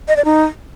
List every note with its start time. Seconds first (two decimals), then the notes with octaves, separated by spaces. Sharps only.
0.08 D#5
0.16 D5
0.25 D#4